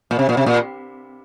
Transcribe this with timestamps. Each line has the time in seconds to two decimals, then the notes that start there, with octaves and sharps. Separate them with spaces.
0.11 A#2
0.19 C3
0.29 A#2
0.37 C3
0.46 A#2